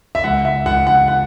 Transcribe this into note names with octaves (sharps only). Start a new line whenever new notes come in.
E5
C#2 F#5
E5
C#2 F#5
F#5
F#5